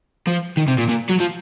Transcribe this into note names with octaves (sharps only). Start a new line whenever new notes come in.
F3
D#3
C3
A#2
A#2
F#3
F3